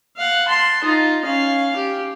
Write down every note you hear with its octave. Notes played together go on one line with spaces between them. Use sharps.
F5 F#5
A5 C6
D#4 F4
C#4 F5
G4